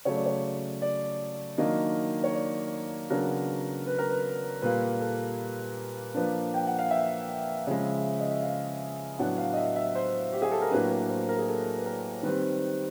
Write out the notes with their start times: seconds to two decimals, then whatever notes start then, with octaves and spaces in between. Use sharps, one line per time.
0.05 C#3 F#3 A3 C#5
0.16 D5
0.26 C#5
0.82 D5
1.58 D#3 F#3 A#3 D4 D#5
2.24 C#5
2.34 D5
3.10 C#3 F#3 B3 D4 A#4
3.86 B4
3.98 A#4
4.10 B4
4.62 A#2 G3 A#3 B4
5.00 A4
6.15 F3 A#3 D4 B4
6.54 G5
6.67 F#5
6.79 F5
6.91 E5
7.67 C#3 F3 G#3
8.20 D#5
8.31 E5
8.43 F5
9.19 A2 F#3 B3 D4 F#5
9.38 F5
9.53 D#5
9.57 E5
9.76 E5
9.95 C5
10.32 G4
10.42 G#4
10.52 A4
10.62 A#4
10.71 A2 F#3 A#3 D4 B4
10.90 B4
11.09 C5
11.29 A#4
11.39 G#4
11.48 A4
11.77 B4
11.86 A#4
12.23 D#3 G3 C4 B4